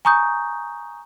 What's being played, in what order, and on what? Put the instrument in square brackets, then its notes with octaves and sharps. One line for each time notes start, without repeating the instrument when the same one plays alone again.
[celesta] G#5 A#5 C#6 D#6 G6